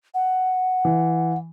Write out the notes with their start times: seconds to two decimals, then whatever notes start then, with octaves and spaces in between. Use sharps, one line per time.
0.14 F#5
0.85 E3